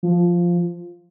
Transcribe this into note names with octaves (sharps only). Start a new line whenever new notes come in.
F3